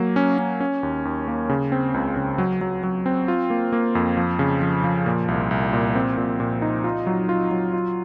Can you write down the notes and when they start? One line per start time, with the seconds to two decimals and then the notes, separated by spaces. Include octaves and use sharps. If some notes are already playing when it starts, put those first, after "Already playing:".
Already playing: F#3 A#3
0.16 C#4
0.39 C#4
0.60 C#4
0.83 D#2
1.05 D#2
1.28 A#3
1.49 C#3
1.72 C4
1.94 C#2
2.17 C#3
2.38 F#3
2.61 F#3
2.83 F#3
3.06 C4
3.28 F4
3.50 A#3
3.73 A#3
3.95 F2
4.17 F3
4.39 C#3
4.62 F3
4.84 F3
5.06 A#2
5.28 C2
5.51 C2
5.73 A#2
5.95 C4
6.17 A#2
6.40 A#2
6.62 D#4
6.84 F4
7.07 F#3
7.29 F4
7.51 F#3
7.73 F4